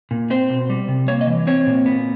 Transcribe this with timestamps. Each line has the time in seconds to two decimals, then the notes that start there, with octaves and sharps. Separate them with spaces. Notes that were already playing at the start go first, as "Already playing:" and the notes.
0.11 A#2
0.30 C4 C5
0.50 B2
0.70 G3
0.88 C3
1.08 A#3 C#5
1.21 D#5
1.27 E3
1.47 C4 C#5
1.66 A#2
1.86 B3